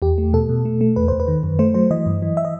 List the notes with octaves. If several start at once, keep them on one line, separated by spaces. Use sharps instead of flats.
E2 G4
A3
B2 A4
B2
A3
A3
E2 B4
E2 C5
B4
D#3
F#2
A3 C5
F#3 C5
E3 D#5
G2
E3
E5
D#5